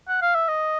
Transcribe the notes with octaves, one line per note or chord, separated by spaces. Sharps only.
F#5
F5
E5
D#5